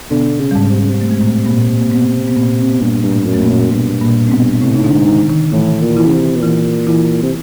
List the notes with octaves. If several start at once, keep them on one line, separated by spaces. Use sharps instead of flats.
B2 D3 B3
C#3
G3
G#2 G#3
C3
C#3
C3
A3
G#3
A2 A3
A#2 A#3
A#3
B2 B3
B3
A#2 A#3
C4
B3
G2 A#2 A#3
G2
A2 A3
F#2
A3
A#2 A#3
F#2
G2 B2 B3
A#2 A#3
C4
B2 B3
B3
A2 C3 C4
D#4
D3 D4
G#2
D#3 D#4
D#3 D#4
A2 E3 E4
A#2
E3 E4
C#3
C3
B2
A#2 E3 E4
E3 E4
C3